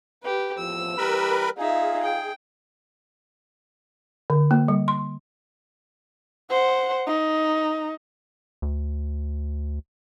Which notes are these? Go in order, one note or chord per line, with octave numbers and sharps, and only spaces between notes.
G4 B4
E2 A2 F3 E6
E3 G3 G4 A#4 B4 B5
D#4 F4 G#4 E5 F5
G5
D3
A#3
G3
C6
C5 F#5
D#4
D2